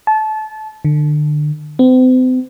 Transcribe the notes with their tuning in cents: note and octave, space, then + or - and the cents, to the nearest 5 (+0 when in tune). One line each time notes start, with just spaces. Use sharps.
A5 -25
D3 +30
C4 -40